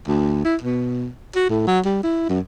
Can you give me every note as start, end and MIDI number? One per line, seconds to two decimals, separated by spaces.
0.08 0.42 38
0.45 0.56 64
0.61 1.08 47
1.36 1.46 66
1.50 1.64 45
1.67 1.79 54
1.85 2.02 55
2.04 2.26 64
2.29 2.40 42